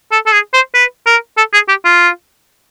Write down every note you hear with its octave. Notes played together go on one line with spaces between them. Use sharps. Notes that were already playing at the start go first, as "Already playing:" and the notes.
A4
A4
G#4
C5
B4
A#4
A4
G#4
G4
F4